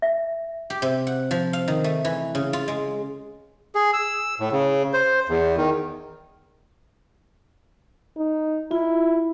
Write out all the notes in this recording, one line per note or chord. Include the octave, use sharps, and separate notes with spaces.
E5
G4
C3
F#5
F3
F5
D#3
A3
E3
C#3
F4
G#3
G#4
E6
A2
C#3
C5
E2
D#3
D#4
E4 F4